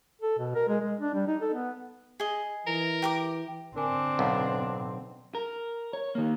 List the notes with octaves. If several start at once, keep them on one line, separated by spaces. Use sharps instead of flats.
A4
B2
A#4
G#3
G#3
D4
G3
D#4
A4
B3
G#4 D#5
E3 A#4
G4 A#5 D6
D3 C4 D4 A#4 G#5
B1 C5 F5 F#5
A#4
C#5
D#3 A#3